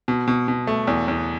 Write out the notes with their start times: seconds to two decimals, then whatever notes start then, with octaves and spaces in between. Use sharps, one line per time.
0.08 B2
0.28 B2
0.48 B2
0.67 A3
0.87 E2
1.08 E2